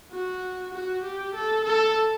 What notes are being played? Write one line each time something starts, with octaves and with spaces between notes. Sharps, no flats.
F#4
F#4
G4
A4
A4